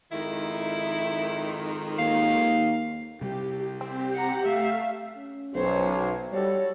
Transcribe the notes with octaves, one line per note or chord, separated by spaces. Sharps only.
F2 G#2 D#3 E4
D#2 F5
C3 G3 G4
C4 G4
F#5 A#5
A3 E5 F5
C#4
B1 C5 C#5
G3 F#4 A4 C#5